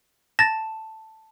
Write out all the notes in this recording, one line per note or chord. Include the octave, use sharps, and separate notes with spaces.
A5 A6 A#6